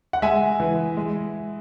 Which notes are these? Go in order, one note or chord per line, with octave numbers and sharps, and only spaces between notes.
F#5
G#3 E5 G#5
E3
G#3